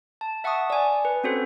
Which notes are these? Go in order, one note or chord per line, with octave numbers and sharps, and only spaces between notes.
A5
E5 F#5 A5 C#6 D#6
D5 G#5
B4
C4 C#4 F#4 A4 C5